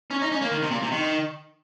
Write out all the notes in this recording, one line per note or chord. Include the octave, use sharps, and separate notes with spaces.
C#4
D#4
C#4
A#3
D#3
C3
A#2
C3
D#3